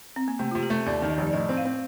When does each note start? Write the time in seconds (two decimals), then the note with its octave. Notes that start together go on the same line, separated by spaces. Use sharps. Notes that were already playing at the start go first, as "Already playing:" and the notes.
0.16 C4
0.28 A#3
0.39 C3 A3
0.51 F4
0.55 C3
0.63 G4
0.70 A3
0.86 D#2 D5
1.02 D#3
1.10 D#5
1.18 F1
1.27 D5
1.33 A2 D#5
1.49 C4
1.57 F5
1.65 C4